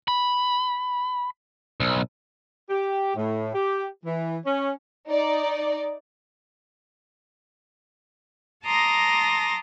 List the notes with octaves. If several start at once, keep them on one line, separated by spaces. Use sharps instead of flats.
B5
B1
G4
A2
G4
E3
C#4
D#4 D5
A5 A#5 C6 D6 D#6 A#6